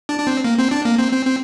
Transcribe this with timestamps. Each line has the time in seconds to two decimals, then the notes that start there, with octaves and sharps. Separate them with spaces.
0.09 D4
0.19 D4
0.27 C4
0.44 A#3
0.58 C4
0.71 D4
0.85 A#3
0.99 C4
1.12 C4
1.26 C4